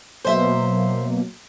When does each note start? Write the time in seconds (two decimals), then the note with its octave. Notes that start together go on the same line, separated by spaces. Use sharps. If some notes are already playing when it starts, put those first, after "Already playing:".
0.25 B2 F#3 A#3 C5 E5